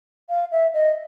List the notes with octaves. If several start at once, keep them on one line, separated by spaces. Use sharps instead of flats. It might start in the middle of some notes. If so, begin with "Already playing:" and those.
F5
E5
D#5